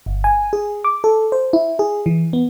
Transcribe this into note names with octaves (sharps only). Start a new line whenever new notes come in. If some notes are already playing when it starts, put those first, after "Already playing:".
G1
G#5
G#4
D6
A4
C5
E4
G#4
E3
B3